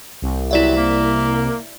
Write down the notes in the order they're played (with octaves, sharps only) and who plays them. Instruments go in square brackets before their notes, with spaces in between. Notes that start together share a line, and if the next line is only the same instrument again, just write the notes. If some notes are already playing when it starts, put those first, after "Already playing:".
[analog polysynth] C2
[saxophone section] C3 F#3 B3 [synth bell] E4 D5 E5
[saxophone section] A#3